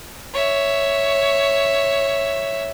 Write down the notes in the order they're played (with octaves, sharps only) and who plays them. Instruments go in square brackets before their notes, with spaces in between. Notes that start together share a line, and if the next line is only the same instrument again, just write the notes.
[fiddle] C#5 E5